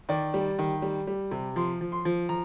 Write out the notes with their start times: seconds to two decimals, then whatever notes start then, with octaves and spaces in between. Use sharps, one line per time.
0.09 D#3 D5
0.34 G3
0.59 D#3
0.82 G3
1.07 G3
1.31 C3
1.56 F3 C6
1.81 F3
1.92 C6
2.05 F3
2.29 F3 A#5